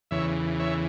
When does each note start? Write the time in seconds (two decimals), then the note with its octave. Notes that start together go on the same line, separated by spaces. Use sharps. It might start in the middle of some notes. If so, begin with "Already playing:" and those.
0.11 E2 C#3 E3 C#5 E5
0.60 C#5 E5